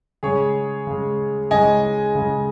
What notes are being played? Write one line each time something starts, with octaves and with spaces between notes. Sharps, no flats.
C#3 G#3 G#4 C#5
C#3 G#3
C#3 G#3 D#5 G#5
C#3 G#3